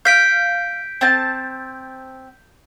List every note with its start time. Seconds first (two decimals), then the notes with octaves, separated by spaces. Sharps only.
0.05 F5 G6 B6 D7
1.01 C4 A5